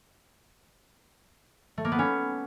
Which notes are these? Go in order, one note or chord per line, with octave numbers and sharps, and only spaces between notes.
A3
A#3
B3
C#4